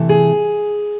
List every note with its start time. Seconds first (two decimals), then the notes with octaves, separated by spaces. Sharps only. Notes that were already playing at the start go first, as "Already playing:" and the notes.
Already playing: C3 E3 A3
0.09 G#4